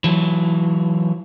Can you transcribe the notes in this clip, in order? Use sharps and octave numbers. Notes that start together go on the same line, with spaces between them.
E3 F#3